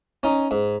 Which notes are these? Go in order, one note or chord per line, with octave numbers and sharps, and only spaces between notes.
C#4 D#4
G#2